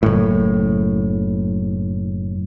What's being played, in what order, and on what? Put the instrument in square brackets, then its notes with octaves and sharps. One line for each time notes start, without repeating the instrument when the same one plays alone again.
[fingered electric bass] F#1 A2